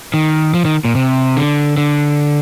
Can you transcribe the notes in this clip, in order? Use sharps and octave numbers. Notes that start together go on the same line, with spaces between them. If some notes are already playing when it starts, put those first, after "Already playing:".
D#3
F3
D#3
A#2
C3
D3
D3